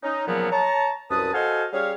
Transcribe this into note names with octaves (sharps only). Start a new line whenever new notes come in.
C#4 D#4
A#2 C#3 F3 F#3 A#3 B3
C#5 A5 A#5
C2 F#2 B4 A5 D#6
F#4 A4 C5 D#5 F5 G#5
G3 C#4 G#4 C#5 F5